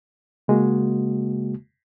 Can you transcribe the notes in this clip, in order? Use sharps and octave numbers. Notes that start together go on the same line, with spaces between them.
C#3 G#3 A#3 F#4